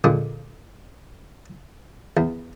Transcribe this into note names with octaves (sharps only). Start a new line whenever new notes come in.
F2 A#2 D3 G#3
E2